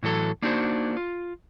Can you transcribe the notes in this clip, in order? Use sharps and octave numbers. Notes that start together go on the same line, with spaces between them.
A2 E3 F#3 A4
A#3 D4 D#4 F#4 G#4 C5
F4